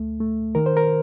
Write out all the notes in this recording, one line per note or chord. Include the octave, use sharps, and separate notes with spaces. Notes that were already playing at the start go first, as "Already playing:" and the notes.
Already playing: D2 A3
A3
D#3 A#4
C5
A#4